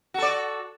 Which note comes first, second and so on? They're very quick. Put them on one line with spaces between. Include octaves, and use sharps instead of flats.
F#4 A4 D5